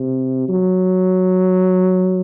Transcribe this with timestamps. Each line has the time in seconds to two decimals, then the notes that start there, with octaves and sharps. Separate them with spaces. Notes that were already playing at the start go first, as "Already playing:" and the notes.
Already playing: C3
0.48 F#3